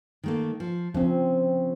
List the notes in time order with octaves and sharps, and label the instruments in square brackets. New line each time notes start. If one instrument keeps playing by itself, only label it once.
[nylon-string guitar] D#3 A3 A#3
F3
[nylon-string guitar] C#3 [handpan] F3 C4